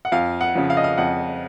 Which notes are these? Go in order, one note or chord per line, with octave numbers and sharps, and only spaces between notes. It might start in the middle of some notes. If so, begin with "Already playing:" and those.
F#5
F2 F5
F#5
C#3 F3
F5
D#5
F5
F2 F#5